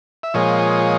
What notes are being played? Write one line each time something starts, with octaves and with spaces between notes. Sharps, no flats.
E5
A#2 F3 G#3 C#5 D#5